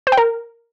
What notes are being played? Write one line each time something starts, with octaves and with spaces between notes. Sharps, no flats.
C5
G5
A#4